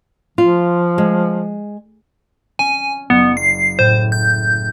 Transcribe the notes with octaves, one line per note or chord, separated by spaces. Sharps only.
F3 F4
G#3
C#4 G#5
F#1 B3
C7
A2 C5
G6